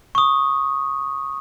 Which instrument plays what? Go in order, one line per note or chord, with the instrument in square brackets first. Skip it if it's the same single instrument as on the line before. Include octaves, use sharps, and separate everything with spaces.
[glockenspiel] C#6 D#6